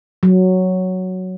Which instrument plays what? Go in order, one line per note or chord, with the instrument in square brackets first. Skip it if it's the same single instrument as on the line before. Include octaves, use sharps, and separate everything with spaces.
[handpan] F#3